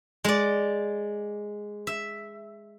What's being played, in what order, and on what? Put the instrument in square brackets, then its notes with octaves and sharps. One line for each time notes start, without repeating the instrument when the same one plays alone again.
[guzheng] G#3 D5
E5